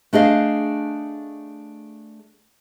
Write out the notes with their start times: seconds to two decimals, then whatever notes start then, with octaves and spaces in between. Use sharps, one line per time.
0.13 A3 D4 G#4 D#5 F5